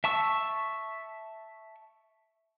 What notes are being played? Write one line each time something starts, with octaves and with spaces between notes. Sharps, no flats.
E5 A5 C#6 E6